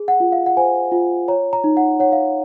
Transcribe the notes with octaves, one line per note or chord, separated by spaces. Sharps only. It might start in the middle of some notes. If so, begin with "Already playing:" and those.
Already playing: G#4
F#5
F4
F5
F#5
C5 G#5
F4
C#5 A#5
A#5
D#4
F#5
C#5 F#5
F5